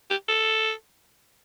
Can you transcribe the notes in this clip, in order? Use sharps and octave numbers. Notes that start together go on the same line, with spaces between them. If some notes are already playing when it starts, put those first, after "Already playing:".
G4
A4